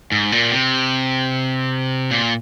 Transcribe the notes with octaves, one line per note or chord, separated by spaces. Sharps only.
G#2
A#2
C3
A#2